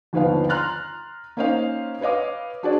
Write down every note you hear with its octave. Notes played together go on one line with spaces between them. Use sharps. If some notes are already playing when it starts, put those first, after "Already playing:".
G1 D#2 F3 B3 F5
A#5 C6 F6 F#6 A6
A#3 C#4 D#4 C5 D#5 F5
B4 C#5 D#5 F5 D6
D4 F#4 G#4 C5 D5